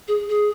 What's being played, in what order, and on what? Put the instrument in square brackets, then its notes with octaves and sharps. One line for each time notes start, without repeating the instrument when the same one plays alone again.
[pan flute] G#4
G#4